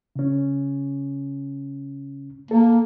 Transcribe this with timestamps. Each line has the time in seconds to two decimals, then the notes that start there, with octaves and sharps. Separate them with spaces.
0.16 C#3 C#4
2.51 A#3 A4